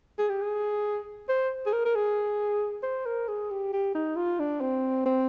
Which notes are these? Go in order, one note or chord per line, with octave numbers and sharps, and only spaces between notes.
G#4
G4
G#4
C5
G#4
A#4
A#4
G#4
C5
A#4
G#4
G4
G4
D#4
F4
D4
C4
C4